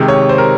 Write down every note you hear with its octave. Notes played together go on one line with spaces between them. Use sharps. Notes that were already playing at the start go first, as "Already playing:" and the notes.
Already playing: C3 D#3 G#3
C#5
C5
A#4